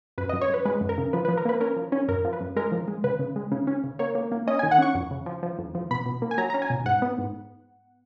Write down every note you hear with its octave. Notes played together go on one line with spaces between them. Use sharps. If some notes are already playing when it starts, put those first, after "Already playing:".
F#2 B4
D#5
F#2
C#5
F#2 B4
G#3 B4
F#2
A#4
C#3
F3 B4
B4
F3
A#4
A#3 B4
C#4 A#4
F3
C#4
F#2 A#4
F3
B4
F#2
G#3 A#4
F3
G#3
C#3 B4
C#3
G#3
C#3
C#4
C#3
A#3 C#5
A#3
A#3
C#4 D#5
G#5
D#3
F#5
C#4 C#6
F2
C#3
F3
F3
F2
F3
B2 B5
B2
A#3
G#5
F#3 A#5
C#4 A#5
G#5
B2
G#2 F#5
B3
G#2